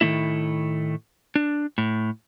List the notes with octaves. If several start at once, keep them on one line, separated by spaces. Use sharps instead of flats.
A2 D#3 A3 A#3 E4
D4
A2